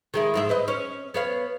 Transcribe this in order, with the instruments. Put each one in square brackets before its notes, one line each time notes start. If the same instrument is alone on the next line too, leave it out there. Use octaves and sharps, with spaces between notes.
[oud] D#3 G#3 E4
G#2 G#3 E5
B4 C5 D#5
C#4
B3 C#5 F5